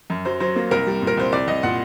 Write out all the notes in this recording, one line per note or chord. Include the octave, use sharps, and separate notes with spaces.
F#2
F#3 C5
F#3 C5
A#3
C2 A#4
G3
A#2
A#4
C2 C5
C2 D5
C2 D#5
A#2 F#5